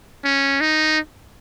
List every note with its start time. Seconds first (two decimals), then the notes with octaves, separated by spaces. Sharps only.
0.24 C#4
0.60 D#4